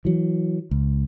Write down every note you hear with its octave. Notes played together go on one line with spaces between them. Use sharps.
E3 F#3
C#2